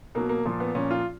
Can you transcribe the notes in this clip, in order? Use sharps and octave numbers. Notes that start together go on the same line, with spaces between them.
B2 F#3 A#3
A#3
A#2 F3
B3
A#2 F3 C#4
F4